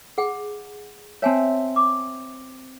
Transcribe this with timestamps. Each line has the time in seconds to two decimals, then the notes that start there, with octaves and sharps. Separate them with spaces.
0.18 G#4 F#5 G5
1.22 C4 C#5 E5 G#5 A5
1.76 D6